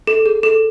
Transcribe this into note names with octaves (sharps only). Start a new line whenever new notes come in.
A4
G#4
A4